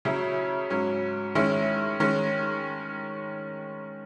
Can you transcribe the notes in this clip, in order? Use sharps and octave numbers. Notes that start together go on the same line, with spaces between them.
C#3 F#3 C#4 E4
G#2 F#3 C#4
D#3 G#3 C#4 E4
D#3 G#3 C#4